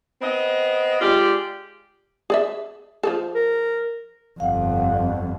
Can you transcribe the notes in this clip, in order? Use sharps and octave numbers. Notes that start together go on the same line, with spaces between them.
B3 C4 D#5
G#3 F4 G4 D5
G#4 D5 E5
F3 G#4 A4
A#4
G1 F2 F5 F#5